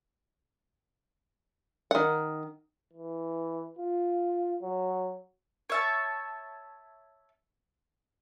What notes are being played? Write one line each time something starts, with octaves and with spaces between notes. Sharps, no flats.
D#3 F#5
E3
F4
F#3
C#5 E5 A5